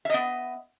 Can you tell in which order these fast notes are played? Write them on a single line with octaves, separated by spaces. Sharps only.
E5 D#5 B3